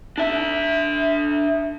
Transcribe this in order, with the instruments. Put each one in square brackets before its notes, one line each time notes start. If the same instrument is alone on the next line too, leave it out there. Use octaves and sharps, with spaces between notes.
[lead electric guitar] D4 E5